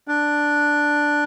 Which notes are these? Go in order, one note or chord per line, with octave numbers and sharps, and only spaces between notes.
D4